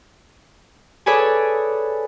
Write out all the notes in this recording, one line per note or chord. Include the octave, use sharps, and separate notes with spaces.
G#4 A4 B4 C#5 D5 G#5